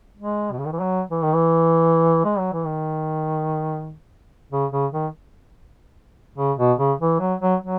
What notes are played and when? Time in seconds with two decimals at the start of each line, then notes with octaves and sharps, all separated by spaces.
0.17 G#3
0.52 B2
0.58 C#3
0.65 D#3
0.72 E3
0.80 F#3
1.10 E3
1.22 D#3
1.34 E3
2.25 G#3
2.38 F#3
2.52 E3
2.66 D#3
4.51 C#3
4.71 C#3
4.93 D#3
6.38 C#3
6.58 B2
6.78 C#3
7.00 E3
7.20 F#3
7.41 F#3
7.62 F#3